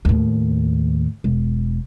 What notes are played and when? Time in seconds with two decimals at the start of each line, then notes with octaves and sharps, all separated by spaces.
0.05 D#2 A2
1.24 E1